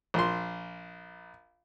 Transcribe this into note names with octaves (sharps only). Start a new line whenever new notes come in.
A#1 C6